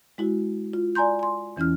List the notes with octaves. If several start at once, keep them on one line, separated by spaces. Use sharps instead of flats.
G#3 E4 F#4
F4
D5 G#5 A#5 C6 G6
G#5 C6
E2 E3 C#4 E4 F6